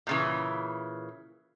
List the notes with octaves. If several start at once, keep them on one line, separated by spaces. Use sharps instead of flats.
A#2 C#3 E3